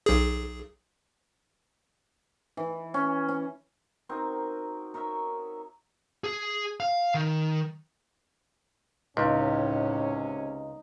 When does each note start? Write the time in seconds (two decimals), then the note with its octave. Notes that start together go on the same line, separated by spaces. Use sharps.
0.06 B1 G#4
2.57 E3
2.94 C#4
3.29 C#4
4.09 C4 D#4 F#4 A#4
4.94 D#4 A#4 C#5 E5
6.24 G#4
6.80 F5
7.15 D#3
9.17 C#2 A2 C3 G#3 C#4 D#4